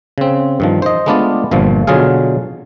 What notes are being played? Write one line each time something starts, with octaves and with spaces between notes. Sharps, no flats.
C#3 C4
G2 D#3 F3
C5 D#5
G#3 A3 B3 D4 F4 D5
G1 G2 A#2 F3
B2 D3 F#3 F4 G#4 F5